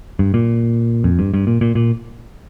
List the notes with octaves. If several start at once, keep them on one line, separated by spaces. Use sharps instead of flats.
G2
A#2
F2
G2
G2
A#2
A#2
A#2